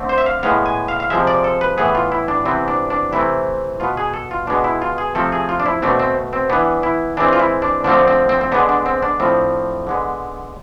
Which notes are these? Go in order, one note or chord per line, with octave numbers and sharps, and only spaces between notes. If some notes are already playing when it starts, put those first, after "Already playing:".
Already playing: D3 A3 C4
C5
E5
F5
A2 G#3 B3 F5
G#5
F5
F5
C3 F3 G#3 E5
D5
A4
B4
A2 E3 B3 G#4
F4
E4
D4
C3 E3 B3 C4
D4
D4
C3 E3 A3 C4 E4
B2 B3 F4
G#4
A4
F4
B2 G#3 B3 D4
E4
F4
G#4
C3 F3 A3 C4 A4
G#4
F4
D4
E4
B2 A3 C4 D4
C4
C4
E3 B3 D4
E4
E3 G#3 C4 D4
F4
E4
D4
D3 F3 A3 C4 D4
C4
C4
C4
D3 G#3 B3 D4
D4
C4
D4
A2 F3 A3 C4
D3 G#3 B3